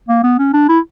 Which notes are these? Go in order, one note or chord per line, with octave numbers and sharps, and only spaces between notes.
A#3
B3
C#4
D4
E4